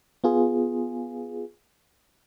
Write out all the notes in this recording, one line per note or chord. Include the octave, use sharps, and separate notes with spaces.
B3 F4 G#4